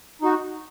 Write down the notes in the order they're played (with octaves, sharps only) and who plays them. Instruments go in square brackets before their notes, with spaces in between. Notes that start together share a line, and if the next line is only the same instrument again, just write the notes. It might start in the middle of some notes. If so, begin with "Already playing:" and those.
[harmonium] D#4 F#4